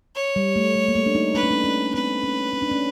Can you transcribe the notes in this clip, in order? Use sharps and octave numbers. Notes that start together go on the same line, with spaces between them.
C#5
G3
A3
A3
A#3
A3
D4
D#4
D4 B4
C#4
D4
C#4
C4 B4
C#4
C#4
D4
C#4